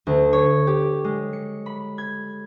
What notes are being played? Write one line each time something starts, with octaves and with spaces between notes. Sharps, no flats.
D2
C#5
G4
G#3
C#7
B5
G#6